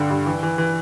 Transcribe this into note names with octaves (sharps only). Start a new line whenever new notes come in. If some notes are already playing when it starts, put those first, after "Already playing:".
Already playing: G2 D3
G2
E3
E3
E3